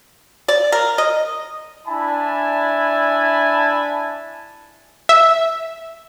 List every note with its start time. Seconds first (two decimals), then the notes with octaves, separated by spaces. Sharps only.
0.48 D5
0.72 A#4
0.98 D#5
1.87 D4 E4 E5 G#5 A5 B5
5.09 E5